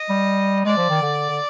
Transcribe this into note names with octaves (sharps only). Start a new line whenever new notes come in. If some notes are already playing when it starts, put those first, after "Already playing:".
Already playing: D#5
G3
G#3 D5
F3
D#3
D3
D3